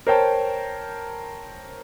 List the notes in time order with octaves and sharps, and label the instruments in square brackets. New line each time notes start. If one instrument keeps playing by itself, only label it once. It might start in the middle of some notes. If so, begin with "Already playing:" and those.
[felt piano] A#4 C5 C#5 G5 A5